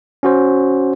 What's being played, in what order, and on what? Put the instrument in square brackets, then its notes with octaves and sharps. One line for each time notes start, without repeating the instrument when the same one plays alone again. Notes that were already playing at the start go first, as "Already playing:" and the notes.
[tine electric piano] C#4 F#4 C5